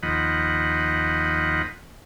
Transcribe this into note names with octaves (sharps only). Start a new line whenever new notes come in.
D#2 F3 D#5 F#5 B5